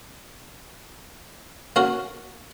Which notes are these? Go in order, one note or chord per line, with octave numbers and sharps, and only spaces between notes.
A#3 C#4 F#4 A#4